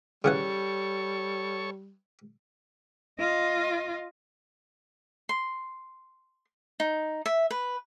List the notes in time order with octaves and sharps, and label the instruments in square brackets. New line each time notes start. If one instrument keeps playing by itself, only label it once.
[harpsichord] C#3 E3 F#5 [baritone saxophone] G3 [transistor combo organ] A4 C#5 C#6
[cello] F4 D#5
[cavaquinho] C6
D#4
E5
B4